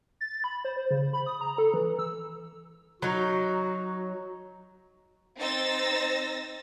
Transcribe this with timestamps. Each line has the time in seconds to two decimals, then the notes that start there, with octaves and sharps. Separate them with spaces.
0.21 A6
0.44 B5
0.65 C5
0.76 C5
0.91 C#3
1.13 B5
1.26 D#6
1.41 A#5
1.58 A4
1.74 E3
1.99 E6
3.02 F#3 D#4 F#4
5.38 C4 D#4 C5 E6 A6 A#6